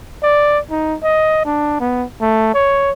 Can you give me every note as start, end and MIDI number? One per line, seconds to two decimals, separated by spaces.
0.23 0.59 74
0.70 0.96 63
1.03 1.41 75
1.45 1.75 62
1.80 2.05 59
2.21 2.53 57
2.54 2.91 73